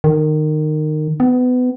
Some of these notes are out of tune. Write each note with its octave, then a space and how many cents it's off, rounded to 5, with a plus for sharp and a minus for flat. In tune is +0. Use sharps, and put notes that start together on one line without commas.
D#3 -20
B3 +25